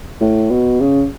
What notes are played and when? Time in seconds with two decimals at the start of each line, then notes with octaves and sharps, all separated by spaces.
0.21 A2
0.51 B2
0.80 C#3